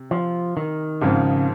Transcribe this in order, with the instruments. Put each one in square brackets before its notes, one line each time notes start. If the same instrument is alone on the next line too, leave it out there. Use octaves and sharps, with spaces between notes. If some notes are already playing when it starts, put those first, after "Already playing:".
Already playing: [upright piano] C3
[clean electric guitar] F3
D#3
[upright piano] G#1 G#2 F3 C4 [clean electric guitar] C#3